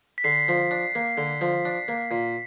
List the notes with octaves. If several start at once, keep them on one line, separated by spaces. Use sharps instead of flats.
B6
D3 C7
F3
D4
A#3
D3
F3
D4
A#3
A#2 B6